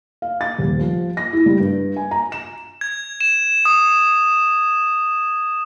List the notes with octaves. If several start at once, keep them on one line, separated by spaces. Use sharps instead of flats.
F5
A6
D#1
F3
A#6
E4
G3
G2
G#5
A#5
E7
G#6
E7
D#6